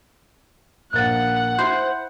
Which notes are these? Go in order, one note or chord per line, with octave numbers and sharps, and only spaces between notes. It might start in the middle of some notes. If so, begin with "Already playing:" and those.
A#1 A#3 F#5 F#6 A6
E4 C5